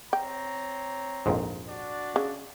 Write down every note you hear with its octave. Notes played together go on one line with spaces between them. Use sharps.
C4 C#5 G5 A#5
A#1 F2 G#2
D4 F#4 D5
C#3